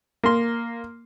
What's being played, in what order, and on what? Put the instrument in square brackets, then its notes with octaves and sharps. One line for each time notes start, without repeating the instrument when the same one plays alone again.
[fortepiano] A#3 C6